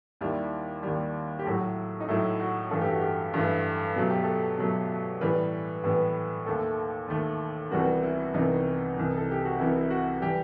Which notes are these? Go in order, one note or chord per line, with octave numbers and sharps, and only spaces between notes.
D#2 D#3 G3 E4
D#2 D#3 G3
G4
A2 F#3 A3 F#4
D#4
A2 F#3 A3 E4
F#4
G2 E3 A3 A4
G4
F#4
G4
G2 E3 A3
B2 F#3 A3 A4
G4
A4
B2 F#3 A3
A2 E3 G3 B3 B4
A2 E3 G3 B3
D#2 D#3 A3 A4
D#2 D#3 A3
C2 C3 E3 G3 B3 F#4
E4
C2 C3 E3 G3 B3 D#4
C2 C3 E3
A4
G4
F#4
C2 C3 E3 E4
F#4
E3 G3 G4